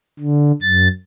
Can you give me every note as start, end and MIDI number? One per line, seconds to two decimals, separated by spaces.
0.20 0.52 50
0.62 0.88 42
0.62 0.88 93